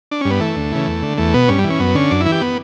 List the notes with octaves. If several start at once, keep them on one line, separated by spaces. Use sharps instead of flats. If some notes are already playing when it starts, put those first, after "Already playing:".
D4
G2 C#4
B3
E3 A3
D2
C#3 E3
E2
D3
E2 A3
B2 B3
G2 C#4
G3
E3
C#4
F#2 B3
D3 C#4
F#2 D4
E4
E3
G4
B3